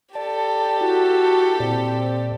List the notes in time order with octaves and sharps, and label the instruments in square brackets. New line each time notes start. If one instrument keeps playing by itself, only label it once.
[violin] G4 A4 [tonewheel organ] D5 A5
[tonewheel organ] E4 [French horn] F#4
[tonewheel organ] A#2 D5 [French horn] C4